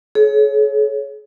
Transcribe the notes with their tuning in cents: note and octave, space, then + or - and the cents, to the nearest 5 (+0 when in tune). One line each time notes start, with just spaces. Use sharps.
G#4 +40 C#5 +0